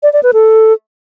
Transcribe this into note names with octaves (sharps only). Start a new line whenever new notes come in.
D5
D5
B4
A4